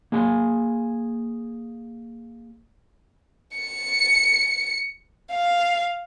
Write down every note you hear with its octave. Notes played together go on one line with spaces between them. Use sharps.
A#3 G#4 G#5
C#7
F5